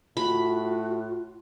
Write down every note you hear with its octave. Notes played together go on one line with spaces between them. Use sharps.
A2 F4 F#4 B5